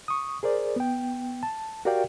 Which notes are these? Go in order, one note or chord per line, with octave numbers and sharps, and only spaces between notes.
C#6 D#6
G#4 A#4 C5 D5
B3 G5
A5
F#4 G4 A#4 D5 F5 G5